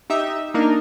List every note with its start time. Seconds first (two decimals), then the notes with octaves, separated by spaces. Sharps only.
0.10 D#4 G4 E5
0.54 A#3 D4 D#4 A#4